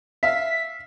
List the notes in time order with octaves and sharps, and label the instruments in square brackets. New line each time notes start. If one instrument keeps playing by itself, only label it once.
[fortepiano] E5 F5 [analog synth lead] B6